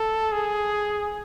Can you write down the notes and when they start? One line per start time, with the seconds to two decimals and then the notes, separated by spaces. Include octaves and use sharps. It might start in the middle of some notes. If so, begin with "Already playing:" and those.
Already playing: A4
0.32 G#4